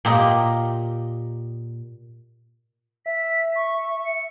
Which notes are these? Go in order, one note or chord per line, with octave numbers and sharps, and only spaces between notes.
A#2 G4 A#4 D#5
E5 B6
C#6
C#7